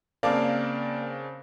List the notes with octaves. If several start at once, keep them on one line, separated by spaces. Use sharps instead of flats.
C#3 A#3 C4 D4 D5 F5 A5 D6